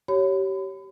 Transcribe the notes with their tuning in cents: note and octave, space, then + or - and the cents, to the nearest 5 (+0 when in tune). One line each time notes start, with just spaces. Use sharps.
G4 -25 C#5 +0 B5 +30